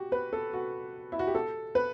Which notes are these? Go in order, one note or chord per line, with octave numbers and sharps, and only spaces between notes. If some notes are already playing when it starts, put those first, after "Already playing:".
Already playing: F#4 G4
B4
A4
F#4
E4
F#4
G4
A4
B4